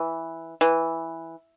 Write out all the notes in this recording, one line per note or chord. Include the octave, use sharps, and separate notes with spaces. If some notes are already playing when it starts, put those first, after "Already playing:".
Already playing: E3
E3